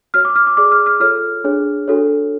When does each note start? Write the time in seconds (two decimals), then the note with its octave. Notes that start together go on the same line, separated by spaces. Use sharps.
0.14 F#4 C#5 F6
0.25 D6
0.36 F6
0.47 D6
0.57 G#4 D5 D6
0.71 F6
0.86 F6
1.00 F4 A4 C#5 F6
1.44 D4 G#4 C#5
1.88 D4 F#4 A4 C#5